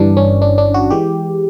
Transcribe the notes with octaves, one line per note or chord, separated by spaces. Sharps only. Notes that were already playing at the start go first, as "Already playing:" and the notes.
Already playing: G1 G2 E3 D4
C#4
D4
D4
F#4
E3 G#3 G4